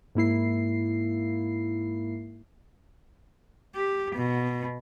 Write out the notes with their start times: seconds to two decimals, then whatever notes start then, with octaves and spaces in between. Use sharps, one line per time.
0.15 G#2 A#3 E4 C7
3.75 G4
4.15 B2